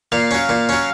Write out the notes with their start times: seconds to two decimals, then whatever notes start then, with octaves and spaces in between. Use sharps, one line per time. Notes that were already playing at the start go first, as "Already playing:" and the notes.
0.12 A#2 F5
0.31 F#3 C#4
0.49 A#2
0.69 F#3 C#4